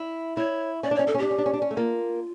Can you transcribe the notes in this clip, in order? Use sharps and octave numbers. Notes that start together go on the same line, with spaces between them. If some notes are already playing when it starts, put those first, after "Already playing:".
Already playing: E4
E4 C#5
C#4 D5
D4
C#5
C#4
D4 A4
C#4
D4 G4
C#4
D4
C#4
D4
C#4
A3
A#3 F4